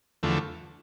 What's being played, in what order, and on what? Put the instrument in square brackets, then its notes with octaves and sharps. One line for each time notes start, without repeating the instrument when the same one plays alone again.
[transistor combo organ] E2 D3 F3 A3